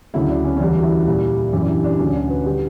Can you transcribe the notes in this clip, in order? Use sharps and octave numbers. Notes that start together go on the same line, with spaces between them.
D2 C#3 F#3 E4
D4
C#4
C#4
E2 D3 G3 D4
F#4
E4
A#2 G3
F#2 E3 G3 G4
D4
E4
D4
D2 D3 F#3 C#4
D4
B4
D3 G3 G4